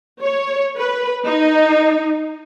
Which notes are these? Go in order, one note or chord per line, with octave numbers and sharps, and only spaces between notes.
C#5
B4
D#4